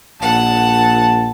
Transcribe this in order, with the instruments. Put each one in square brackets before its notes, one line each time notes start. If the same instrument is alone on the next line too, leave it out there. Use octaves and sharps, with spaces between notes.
[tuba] A#1 [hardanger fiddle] F#5 [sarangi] A5